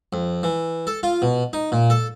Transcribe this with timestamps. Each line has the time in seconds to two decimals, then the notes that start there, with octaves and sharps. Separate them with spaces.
0.13 F2
0.43 E3
0.87 A4
1.03 F4
1.22 B2
1.53 D#4
1.72 A#2
1.90 A4